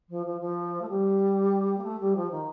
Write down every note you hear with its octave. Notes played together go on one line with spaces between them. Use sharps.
F3
F3
F3
A3
G3
A#3
A3
G3
F3
D#3